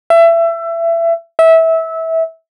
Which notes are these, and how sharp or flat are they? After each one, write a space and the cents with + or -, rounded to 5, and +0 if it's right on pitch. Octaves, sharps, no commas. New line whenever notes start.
E5 +25
E5 -20